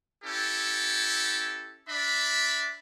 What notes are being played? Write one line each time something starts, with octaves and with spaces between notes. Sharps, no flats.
C#4 E4 G4 A4
D4 D5 E5 B5